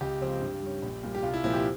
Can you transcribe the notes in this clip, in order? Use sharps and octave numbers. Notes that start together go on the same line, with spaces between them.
C#2 G4
C#3 F3 G#3 C4
G2
G3 C#4
A#1
A#2 G3
G4
C2 F4
E4
A#2 F3 C4 E4
G4